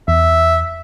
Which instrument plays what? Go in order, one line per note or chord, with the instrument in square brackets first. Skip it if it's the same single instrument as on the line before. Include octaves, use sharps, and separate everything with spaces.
[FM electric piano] E2 [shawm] E5